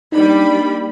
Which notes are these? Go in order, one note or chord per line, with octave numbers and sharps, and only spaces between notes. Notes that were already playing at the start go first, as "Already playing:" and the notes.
G3 A#3 D4 D#4 B5